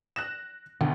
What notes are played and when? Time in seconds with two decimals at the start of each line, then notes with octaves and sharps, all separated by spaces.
0.16 F#6 A#6 E7
0.81 D2 B2 D3